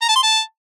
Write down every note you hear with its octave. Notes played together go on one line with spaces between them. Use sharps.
A#5
A5
C6
A5